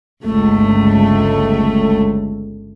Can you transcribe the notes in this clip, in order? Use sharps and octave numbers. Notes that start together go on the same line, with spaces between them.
G1 C#2 A3